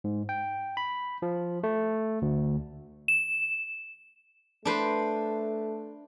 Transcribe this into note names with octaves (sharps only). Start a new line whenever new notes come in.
G#2
G5
B5
F3
A3
D2
E7
A3 D4 B4 C5